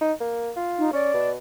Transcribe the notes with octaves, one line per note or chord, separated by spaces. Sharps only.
D#4
A#3
F4
D#4
C#4 D5
B2